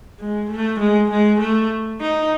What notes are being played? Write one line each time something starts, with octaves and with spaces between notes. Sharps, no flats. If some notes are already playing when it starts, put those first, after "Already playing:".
G#3
A3
G#3
G#3
A3
D#4